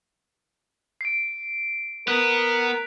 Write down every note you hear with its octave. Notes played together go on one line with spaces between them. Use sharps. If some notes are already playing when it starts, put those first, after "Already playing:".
C7 D7
B3 A#4 F#6 B6 F7